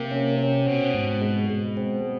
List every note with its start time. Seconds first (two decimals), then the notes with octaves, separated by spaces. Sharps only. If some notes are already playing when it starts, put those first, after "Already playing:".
Already playing: C3 A#3
0.11 C#4
0.39 C#4
0.66 B2 C4
0.94 G#2
1.21 G#3
1.50 G#3
1.77 C4